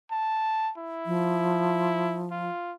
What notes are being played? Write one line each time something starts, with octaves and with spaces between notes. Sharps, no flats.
A5
E4
F3
F4